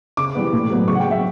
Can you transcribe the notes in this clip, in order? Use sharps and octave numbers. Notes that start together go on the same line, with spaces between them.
C#3 D6
E3 G3 B3
A2
F#3 B3
C#3 C#6
F#5
G5
F#3 B3
E5